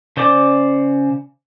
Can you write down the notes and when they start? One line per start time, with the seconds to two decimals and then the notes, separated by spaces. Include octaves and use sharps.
0.17 C#3 C5 D5 D6